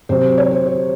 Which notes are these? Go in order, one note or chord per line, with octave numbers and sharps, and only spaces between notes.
C3 F#3 C4 C5
C#5
C5
C5